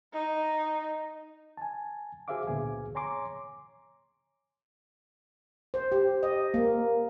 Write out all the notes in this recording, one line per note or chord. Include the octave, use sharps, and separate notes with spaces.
D#4
G#5 A5
F#4 G#4 C5 E5 F5 D6
C#2 A#2 D3 B3 G#4 G#5
C#5 G#5 A#5 C6 D6
C5
G4
D#5
A#3